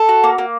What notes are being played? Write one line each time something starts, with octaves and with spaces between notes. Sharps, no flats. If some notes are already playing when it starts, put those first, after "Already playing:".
Already playing: A4
F#4
A#3
A#3